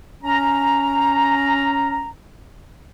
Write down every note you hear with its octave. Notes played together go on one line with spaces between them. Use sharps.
C#4 A#5